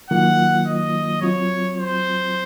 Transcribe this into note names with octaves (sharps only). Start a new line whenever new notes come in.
D#3 F#3 A#3 F4 F#5
D#5
F#3 C4 F4 C#5
C5